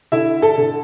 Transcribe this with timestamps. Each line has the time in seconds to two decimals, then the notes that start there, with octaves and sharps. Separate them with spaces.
0.12 D3 E4 E5
0.42 A4 A5
0.58 D3